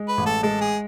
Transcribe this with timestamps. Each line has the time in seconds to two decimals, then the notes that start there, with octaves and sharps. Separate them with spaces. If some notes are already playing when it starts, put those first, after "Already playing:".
Already playing: G#3
0.08 B4
0.18 A1
0.26 A4
0.43 G#3 A4
0.61 G#4